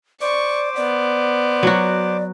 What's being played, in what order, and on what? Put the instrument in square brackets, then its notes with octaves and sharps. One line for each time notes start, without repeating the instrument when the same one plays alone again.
[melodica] C5 D6 [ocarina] D5 [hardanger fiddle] C#6
[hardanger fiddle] B3 [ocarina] D5
[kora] F#3 F#4